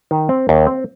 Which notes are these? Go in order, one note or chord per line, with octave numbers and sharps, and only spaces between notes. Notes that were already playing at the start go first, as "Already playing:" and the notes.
D#3
C4
D#2
C4